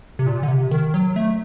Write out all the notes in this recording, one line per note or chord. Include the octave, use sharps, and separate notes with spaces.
C3
A#2
D3
C3
D#3
F#3
A3